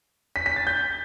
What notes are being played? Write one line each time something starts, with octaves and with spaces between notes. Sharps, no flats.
B6
B6
A6
G6